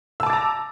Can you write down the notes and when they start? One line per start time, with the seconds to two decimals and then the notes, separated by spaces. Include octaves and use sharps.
0.20 E6
0.23 A5
0.26 D6
0.30 A6
0.33 A#5